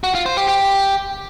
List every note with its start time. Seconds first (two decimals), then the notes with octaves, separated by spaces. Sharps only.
0.04 F#4
0.15 F4
0.26 C5
0.37 G4
0.48 G4